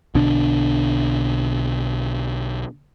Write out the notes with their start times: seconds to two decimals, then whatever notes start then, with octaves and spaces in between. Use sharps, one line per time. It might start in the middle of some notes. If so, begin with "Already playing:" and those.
0.14 B1 B2 D3 D4